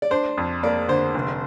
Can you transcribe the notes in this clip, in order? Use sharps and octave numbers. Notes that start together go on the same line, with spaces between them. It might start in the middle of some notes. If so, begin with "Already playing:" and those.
D5
D4 C5
F2
A#3 D5
D3 C5
F1